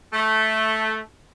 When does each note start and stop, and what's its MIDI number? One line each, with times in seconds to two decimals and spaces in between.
0.13 0.97 57